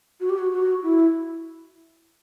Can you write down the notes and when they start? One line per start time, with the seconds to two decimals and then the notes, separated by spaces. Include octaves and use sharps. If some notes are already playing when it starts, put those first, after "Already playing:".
0.20 F#4
0.30 G4
0.38 F#4
0.52 F#4
0.83 E4